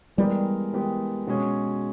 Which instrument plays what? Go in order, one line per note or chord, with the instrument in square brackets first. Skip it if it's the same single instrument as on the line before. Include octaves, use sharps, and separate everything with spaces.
[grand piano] E3 G#3 B3 G4 A#4 [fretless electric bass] G3
[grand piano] E3 G#3 B3 G4 A#4
B2 G#3 C#4 G#4